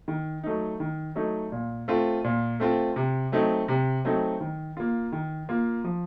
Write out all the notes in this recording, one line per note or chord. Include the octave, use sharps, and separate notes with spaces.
D#3
F#3 A3 D#4
D#3
F#3 A3 D#4
A#2
A3 C4 F4
A#2
A3 C4 F4
C3
F#3 A3 C4 D#4
C3
F#3 A3 C4 D#4
D#3
A#3 F4
D#3
A#3 F4
F3